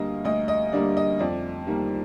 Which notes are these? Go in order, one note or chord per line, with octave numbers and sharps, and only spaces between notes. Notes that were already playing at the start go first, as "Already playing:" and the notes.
Already playing: D2 D3 G3 A#3 D#5 F5
D2 D#5
D#5
D3 G3 A#3 D5
D#5
F2 D5
D#3 G3 A#3